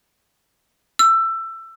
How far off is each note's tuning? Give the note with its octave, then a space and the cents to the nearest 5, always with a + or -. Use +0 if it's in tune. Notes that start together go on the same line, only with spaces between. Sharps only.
E6 +20